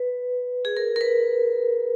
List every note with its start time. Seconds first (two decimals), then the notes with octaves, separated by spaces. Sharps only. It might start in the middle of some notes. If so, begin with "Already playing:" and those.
Already playing: B4
0.65 G#4
0.77 A#4
0.96 A#4
1.01 B4